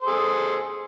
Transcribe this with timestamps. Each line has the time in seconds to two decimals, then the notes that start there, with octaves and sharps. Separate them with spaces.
0.01 C5
0.04 A4
0.07 G#4